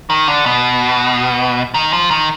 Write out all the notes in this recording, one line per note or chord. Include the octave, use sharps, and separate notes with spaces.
D#3
D3
B2
D#3
F3
D#3